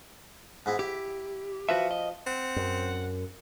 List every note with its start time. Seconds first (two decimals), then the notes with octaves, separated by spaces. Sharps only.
0.66 G#2 B3 E4
0.79 E4 G4
1.69 F3 F#4 B4 E5
1.91 D#5
2.27 C4 F#5
2.56 F#2